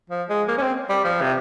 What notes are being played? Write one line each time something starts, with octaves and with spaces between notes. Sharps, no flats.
F3
G#3
A#3
C#4
C4
G3
F3
C3